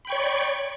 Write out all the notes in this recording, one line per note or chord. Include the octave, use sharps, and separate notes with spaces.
C#5 D5 G5 B5 C#6